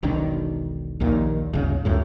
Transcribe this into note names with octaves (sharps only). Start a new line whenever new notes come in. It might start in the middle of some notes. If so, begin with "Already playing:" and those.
E1 B1 D#3 D4
A#1 D#2 A#2 D#3
D1 G1 C#3
C#2 F#2 A2